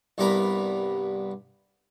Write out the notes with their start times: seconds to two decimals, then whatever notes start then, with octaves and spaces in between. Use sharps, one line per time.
0.18 C2 G2 B3 A#4 A#5 B5